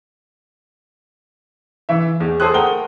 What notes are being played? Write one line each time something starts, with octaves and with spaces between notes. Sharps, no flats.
E3 E5
E2
G#4 A4 C5 C6 D#6 F#6
A3 A#4 F#5 G5 D#6 G7